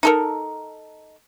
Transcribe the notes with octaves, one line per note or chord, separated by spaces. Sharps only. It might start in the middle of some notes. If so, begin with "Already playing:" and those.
D#4 A4 A#4